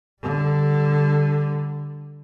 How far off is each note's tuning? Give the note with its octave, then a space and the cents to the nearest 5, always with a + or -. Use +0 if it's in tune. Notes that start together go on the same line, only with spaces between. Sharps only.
D3 +0 G3 +0